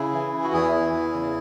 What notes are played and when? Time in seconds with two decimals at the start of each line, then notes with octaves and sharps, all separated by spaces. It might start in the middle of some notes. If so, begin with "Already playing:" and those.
Already playing: C#3 E4 G#4
0.13 E3
0.33 E3
0.44 F#4
0.53 E2 E4 G#4
0.73 E3
0.93 E2
1.13 C#3